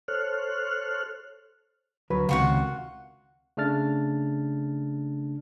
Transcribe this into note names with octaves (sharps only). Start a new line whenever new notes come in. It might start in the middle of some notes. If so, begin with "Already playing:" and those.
A4 C5 C#5 F6 F#6
D2 F#3 B4
C#2 C3 D#3 F4 F#4 F#5
C#3 A3 D4 F6 A6